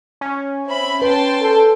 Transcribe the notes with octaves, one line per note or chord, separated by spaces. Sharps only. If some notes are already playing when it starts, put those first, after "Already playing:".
C#4
C4 E5 B5
B4 G5 A5 C6
A4